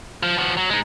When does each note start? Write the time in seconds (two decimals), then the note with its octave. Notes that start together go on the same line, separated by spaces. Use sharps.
0.23 F3
0.38 F3 F#4
0.57 F#3
0.70 G#3 D#4